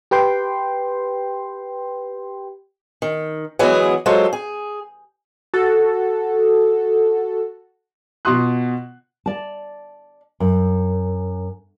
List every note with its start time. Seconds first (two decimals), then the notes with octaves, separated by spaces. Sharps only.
0.11 G4 B4 G5 C6
3.02 D#3
3.59 E3 F#3 G#3 B3 G#4
4.06 F#3 G#3 F4 A4 C5
4.33 G#4
5.54 F#4 A4
8.25 B2 F4 F#4 C6 D#6 F#6
9.26 D5 A5
10.40 F#2